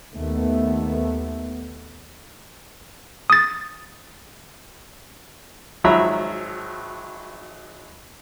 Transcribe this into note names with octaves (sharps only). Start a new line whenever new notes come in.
D#2 A3 B3
D#6 A6
G#1 F3 F#3 E5 A#5 B5